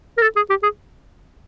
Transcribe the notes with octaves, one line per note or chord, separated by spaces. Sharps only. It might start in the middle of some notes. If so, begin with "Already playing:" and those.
A#4
A4
G#4
G4
G#4